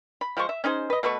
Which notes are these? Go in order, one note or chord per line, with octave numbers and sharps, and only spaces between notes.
B5
F3 G#3 C5 C#6
E5
C#4 D#4 G#4 C5
B4 D#5
B2 A3 B4 C#6